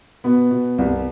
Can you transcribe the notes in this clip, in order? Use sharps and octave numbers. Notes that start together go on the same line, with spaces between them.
B2 B3
B2
C2